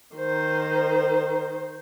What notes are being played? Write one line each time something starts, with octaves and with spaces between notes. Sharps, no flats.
D#3 C5